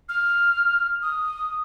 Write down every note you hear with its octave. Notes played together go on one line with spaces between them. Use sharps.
F6
D#6